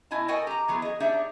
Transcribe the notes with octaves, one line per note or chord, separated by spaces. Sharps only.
B2 E4 D#5 G#5 A5
F#4 A4 A#4 D#5 G5 G#5
G4 A#5
E3 F#3 B3 G#4
G#4 D#5
D4 D#4 G4 G#4 D5 E5